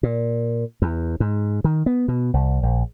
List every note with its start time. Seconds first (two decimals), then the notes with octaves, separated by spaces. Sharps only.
0.03 A#2
0.82 E2
1.20 G#2
1.64 D#3
1.86 B3
2.08 B2
2.34 C2
2.63 A#1